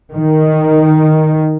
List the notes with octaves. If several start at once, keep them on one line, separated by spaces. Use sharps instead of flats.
D#3